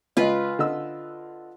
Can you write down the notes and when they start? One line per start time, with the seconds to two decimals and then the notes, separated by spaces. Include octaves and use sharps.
0.17 C#2 F4 B4 D#5
0.59 D3 D#5 E6